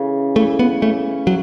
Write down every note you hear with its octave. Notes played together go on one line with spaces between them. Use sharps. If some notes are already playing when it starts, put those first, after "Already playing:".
Already playing: C#3 E3
E3 A3
B3
A3 C#4
F#3